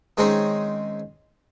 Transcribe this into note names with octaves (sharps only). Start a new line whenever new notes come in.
D#3 G#3 C4 C#4 D#4